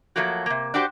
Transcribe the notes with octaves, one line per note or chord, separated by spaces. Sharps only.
F3 F#3 A3 A#3 F#4
C3 A#3
D4 F#4 G4 C5